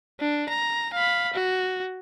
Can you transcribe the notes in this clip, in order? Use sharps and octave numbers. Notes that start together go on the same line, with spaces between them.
D4
A#5
F5 B5
F#4